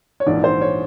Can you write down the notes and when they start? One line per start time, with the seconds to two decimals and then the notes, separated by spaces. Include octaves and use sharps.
0.20 C#5
0.26 A#1 G#2 E3 D5
0.44 C5
0.61 C#5